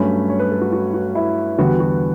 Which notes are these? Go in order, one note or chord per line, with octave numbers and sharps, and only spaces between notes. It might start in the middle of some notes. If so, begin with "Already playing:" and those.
Already playing: G2 F#3 A3 C#4 B5
C#5
B4
A4
F#4
F#4
F#4
E4
E2 D3 G3 B3 F#4
F#4